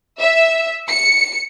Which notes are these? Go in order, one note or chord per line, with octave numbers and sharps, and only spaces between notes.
E5
C#7